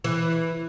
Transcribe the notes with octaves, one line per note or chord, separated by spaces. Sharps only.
E3